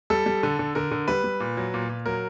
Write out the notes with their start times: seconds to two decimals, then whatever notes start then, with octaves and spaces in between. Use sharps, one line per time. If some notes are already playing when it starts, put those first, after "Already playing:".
0.10 G3 A4
0.26 G3
0.43 D3
0.59 D3
0.75 D3 A#4
0.91 D3
1.08 G3 B4
1.24 G3
1.40 A#2
1.57 F#3
1.74 A#2
1.89 A#2
2.06 F#3 A#4